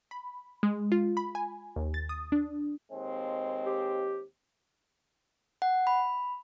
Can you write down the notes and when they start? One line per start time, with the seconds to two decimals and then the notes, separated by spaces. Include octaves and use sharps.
0.11 B5
0.63 G#3
0.92 F4
1.17 B5
1.35 G#5
1.76 D#2
1.94 A6
2.09 D#6
2.32 D4
2.91 D#2 G#3 C4
3.66 G4
5.62 F#5
5.87 B5